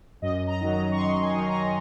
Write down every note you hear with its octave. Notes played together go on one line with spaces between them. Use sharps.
F#2 D#5
A#5
D#3 F#3
A#5
C#6
F#2 C6
G#5
D#3 F#3
A#5